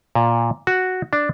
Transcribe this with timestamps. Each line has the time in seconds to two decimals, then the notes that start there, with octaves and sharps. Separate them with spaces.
0.15 A#2
0.67 F#4
1.13 D4